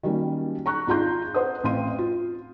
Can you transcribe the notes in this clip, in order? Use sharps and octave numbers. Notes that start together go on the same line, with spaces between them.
D#3 F#3 G3 A#3 C#4
A#5 C#6 F#6
G#1 F4 G#4 A#5 C6 G6
B4 C5 F#5 D#6
A1 C4 F5 C6 D#7
F4